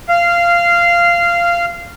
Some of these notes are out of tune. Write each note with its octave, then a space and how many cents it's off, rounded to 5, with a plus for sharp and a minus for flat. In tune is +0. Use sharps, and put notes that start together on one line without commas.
F5 -15